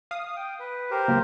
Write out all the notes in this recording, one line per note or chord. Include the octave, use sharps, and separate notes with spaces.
F5 D#6
G5
B4
G4 A#4 C5
C#2 F#3 A#3